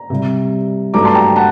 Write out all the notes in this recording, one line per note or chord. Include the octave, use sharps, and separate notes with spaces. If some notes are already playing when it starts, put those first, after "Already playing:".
Already playing: A#5
C3 G3
G2 F#3 A3 A#5 D6
A5 C6
G5 A#5
F#5 A5